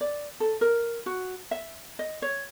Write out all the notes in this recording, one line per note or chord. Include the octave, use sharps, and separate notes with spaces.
D5
A4
A#4
F#4
E5
D#5
C#5